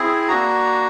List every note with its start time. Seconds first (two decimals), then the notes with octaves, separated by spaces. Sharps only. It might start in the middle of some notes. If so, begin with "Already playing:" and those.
Already playing: C4 E4 G#4
0.28 A#3 D4 F#4 A#5